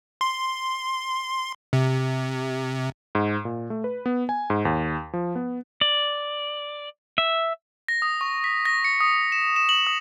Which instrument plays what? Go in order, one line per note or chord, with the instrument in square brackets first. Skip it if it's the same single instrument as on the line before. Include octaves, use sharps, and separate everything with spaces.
[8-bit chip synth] C6
C3
[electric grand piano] G#2
A#2
A3
B4
B3
G#5
G#2
D#2
F3
B3
[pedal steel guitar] D5
E5
[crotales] A#6
D#6
C#6
B6
A#6
C#7
D#6
E7
E7
F#7
D#6